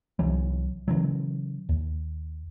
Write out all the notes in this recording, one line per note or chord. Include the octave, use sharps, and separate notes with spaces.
C2 E3 F#3
C#3 E3 F#3
D#2